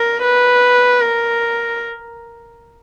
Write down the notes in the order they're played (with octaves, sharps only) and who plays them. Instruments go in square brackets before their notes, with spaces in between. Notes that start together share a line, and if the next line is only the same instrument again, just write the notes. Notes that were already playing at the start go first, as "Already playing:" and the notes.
Already playing: [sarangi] A#4
B4
A#4